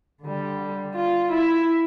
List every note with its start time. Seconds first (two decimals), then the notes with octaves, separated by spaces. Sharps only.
0.22 D3 G3
0.95 F4
1.32 E4